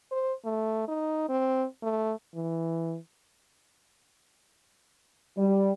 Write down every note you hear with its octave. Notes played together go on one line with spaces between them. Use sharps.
C5
A3
D#4
C4
A3
E3
G3